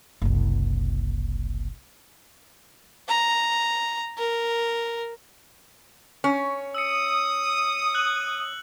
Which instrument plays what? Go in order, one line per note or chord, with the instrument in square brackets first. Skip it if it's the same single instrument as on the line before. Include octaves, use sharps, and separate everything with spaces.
[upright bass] F#1 C2
[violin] A#5
A#4
[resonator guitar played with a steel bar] C#4
[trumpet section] D#6 [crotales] E6 C#7
[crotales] F#6 F#7